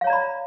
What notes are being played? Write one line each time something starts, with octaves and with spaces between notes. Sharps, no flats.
C#5 D5 F5 A#5 B5